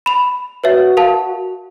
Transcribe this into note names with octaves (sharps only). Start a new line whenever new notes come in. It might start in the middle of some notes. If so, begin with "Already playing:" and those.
B5 F7
F#4 B4 C#5 E5
A#4 F5 A5